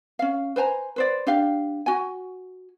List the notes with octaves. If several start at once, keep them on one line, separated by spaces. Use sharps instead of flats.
C#4 F5
B4 C5 G#5 A#5
B4 C5 D5
D4 G4 F5
F#4 G#5